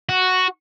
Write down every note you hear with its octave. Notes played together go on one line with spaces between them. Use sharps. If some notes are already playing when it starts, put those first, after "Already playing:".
F#4